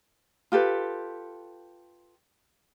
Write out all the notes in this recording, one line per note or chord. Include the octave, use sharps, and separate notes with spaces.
F4 G4 A4 B4